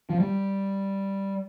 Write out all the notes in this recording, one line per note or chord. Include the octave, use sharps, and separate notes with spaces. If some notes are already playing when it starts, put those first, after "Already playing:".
F3
G3